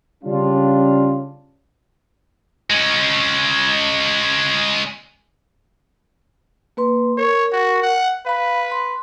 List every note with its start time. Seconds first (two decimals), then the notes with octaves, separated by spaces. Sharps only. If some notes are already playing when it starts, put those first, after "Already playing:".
0.24 C#3 G3 C#4 D4 F4
2.70 G#3 C#4
6.77 A#3 B4 C6
7.18 A#4 C#5
7.53 F#4
7.83 F#5
8.26 B4 F5 B5
8.71 C6